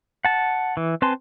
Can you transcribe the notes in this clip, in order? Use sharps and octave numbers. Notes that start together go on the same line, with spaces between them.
F#5 A5
E3
C4 B4 G#5 A5 C6